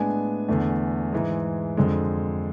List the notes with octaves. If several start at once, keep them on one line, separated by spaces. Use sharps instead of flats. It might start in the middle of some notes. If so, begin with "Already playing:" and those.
Already playing: A2 G#3 B3 D4 G#5
E2 D3 A3
G#2 E3 G#3
F2 D3 G#3